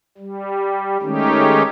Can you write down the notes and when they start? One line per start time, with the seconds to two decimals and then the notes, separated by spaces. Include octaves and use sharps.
0.18 G3
1.02 D#3 G#3 A3 C#4 D#4 G4